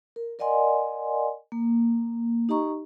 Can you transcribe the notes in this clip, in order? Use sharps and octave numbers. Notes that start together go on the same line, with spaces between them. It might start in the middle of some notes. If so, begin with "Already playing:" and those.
A#4
A#4 D5 D#5 F#5 G#5 C6
A#3
D#4 G4 D#5 A#5 C#6